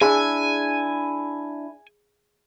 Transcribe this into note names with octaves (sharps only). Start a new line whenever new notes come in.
D4 E4 G#4 G#5